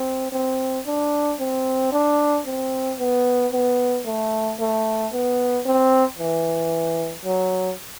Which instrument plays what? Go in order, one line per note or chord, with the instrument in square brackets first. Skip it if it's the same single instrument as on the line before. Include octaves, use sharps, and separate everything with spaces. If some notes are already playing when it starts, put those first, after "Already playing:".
Already playing: [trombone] C4
C4
D4
C4
D4
C4
B3
B3
A3
A3
B3
C4
E3
F#3